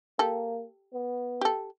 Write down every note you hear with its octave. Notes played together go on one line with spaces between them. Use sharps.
A#3 G4 A4
B3
G4 A4